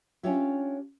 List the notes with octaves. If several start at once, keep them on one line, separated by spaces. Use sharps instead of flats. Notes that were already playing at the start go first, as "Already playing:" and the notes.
C#4 D4 F4 G4 C#5 E5